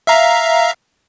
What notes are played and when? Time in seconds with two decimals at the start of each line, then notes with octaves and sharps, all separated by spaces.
0.07 E5 F5 A#5